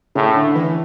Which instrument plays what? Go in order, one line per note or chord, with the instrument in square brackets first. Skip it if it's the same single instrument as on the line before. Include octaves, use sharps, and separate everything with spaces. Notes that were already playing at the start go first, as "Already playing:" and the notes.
[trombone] A2 [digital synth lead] C#3
[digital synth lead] D3
E3